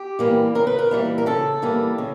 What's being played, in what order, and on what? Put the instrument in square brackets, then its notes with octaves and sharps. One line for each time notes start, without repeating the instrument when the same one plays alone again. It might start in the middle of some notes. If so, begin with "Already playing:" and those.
Already playing: [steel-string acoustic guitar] G4
E3 G3 A#3
C#3 A#4
B4
A#4
E3 G3 A#3
A#4
C#3 A4
E3 G3 A#3
C#3